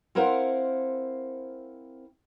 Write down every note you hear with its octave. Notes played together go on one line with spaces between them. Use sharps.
C4 E4 A#4 C5 F5 F#5